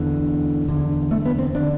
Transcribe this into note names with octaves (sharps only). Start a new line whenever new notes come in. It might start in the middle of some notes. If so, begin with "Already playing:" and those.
Already playing: E2 D3
E2 D3
A3
B3
C4
D3 D4